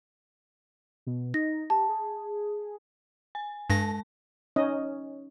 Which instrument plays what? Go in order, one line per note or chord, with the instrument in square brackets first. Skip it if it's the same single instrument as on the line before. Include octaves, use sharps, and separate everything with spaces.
[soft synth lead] B2
[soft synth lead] D#4 [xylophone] A#6
[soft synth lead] G4 [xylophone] A5
[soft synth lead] G#4
[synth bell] G#5
[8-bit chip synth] G2 A#6 [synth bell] G#3 A5
[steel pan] C#4 D#4 D#5